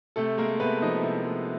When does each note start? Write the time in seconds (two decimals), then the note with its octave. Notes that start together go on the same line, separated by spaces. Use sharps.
0.16 C3 A3 A4
0.38 G#3 A#3 A#4
0.60 C3 B3 B4
0.81 F3 D#4 D#5
1.03 C3 E4 E5
1.24 G#3